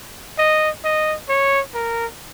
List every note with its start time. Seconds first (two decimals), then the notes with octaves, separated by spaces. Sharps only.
0.38 D#5
0.84 D#5
1.29 C#5
1.74 A#4